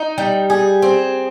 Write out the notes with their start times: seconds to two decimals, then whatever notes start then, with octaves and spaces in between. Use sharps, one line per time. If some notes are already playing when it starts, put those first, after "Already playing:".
Already playing: D#4
0.18 G3
0.50 G#4
0.82 C4